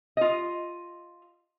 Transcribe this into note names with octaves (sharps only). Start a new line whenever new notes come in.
F4 D#5